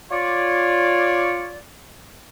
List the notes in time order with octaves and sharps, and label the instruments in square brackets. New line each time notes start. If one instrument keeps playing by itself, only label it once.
[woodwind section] F4 C#5 D5